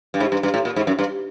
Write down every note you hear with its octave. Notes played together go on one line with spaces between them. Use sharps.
G2
G#2
G2
G2
A2
A#2
G#2
F#2
G2